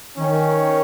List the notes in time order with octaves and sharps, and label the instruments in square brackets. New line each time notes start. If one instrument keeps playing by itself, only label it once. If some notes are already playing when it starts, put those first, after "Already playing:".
[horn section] D#3 [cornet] C#4